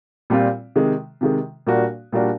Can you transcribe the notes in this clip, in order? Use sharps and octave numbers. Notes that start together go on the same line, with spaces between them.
A#2 G3 C4 F4
C3 D#3 G#3
C3 D#3 G#3
A#2 G3 A#3 D4 F#4
A#2 G3 A#3 D4 F#4